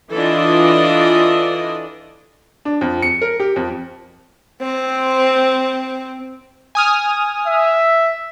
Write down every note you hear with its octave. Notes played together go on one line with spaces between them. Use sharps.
E3 D4 F4 A4 D5 D#5
D4
F2
C#7
A#4
G4
F2
C4 C5
G#5 D#6 F6
E5